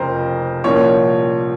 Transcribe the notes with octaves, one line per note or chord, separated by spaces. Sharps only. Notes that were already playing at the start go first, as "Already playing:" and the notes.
Already playing: F1 F2 C#3 F3 A#4 C5
C2 A#2 F3 A#3 C#4 C#5